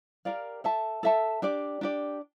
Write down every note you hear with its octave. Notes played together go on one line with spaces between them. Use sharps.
G4 A#4 D5 F5
A4 E5 A5
A4 E5 A5
D4 G4 D5
D4 G4 D5